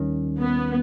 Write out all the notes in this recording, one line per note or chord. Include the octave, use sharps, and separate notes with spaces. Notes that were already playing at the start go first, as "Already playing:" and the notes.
Already playing: D#2 D#3 G3 C#4
B3